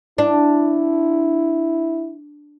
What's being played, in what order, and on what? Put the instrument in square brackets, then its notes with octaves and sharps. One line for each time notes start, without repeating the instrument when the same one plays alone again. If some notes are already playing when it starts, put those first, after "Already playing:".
[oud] D4 [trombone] E4